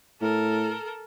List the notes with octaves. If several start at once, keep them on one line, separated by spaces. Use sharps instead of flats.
A2 A4 A#4